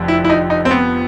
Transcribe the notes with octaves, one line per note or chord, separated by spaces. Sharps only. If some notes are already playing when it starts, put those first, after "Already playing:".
Already playing: F1 F2 D3
E4
E4
D#4
D#4
C4
B3